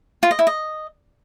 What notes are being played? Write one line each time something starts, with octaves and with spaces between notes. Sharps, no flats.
F4
D#5
E4
D#5